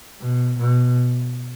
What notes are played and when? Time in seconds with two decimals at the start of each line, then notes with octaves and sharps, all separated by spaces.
0.21 B2
0.58 B2